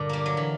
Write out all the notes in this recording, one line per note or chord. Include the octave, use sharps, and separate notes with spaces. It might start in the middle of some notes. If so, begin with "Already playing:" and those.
Already playing: G2 A#2 D3
G3 A#3
F#3
E3